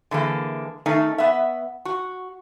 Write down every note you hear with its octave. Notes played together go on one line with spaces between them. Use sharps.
D3 E3 G#3 A#3
D#3 A3 C#4 D#4
B3 E5
F#4